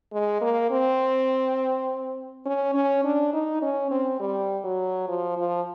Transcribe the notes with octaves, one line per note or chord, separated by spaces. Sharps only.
G#3
A#3
C4
C#4
C#4
D4
D#4
C#4
C4
G3
F#3
F3
F3